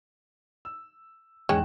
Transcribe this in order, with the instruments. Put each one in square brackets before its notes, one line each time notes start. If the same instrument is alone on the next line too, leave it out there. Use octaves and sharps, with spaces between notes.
[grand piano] E6
[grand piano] E2 G#2 F#6 [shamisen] G#3 C#4 [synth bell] G5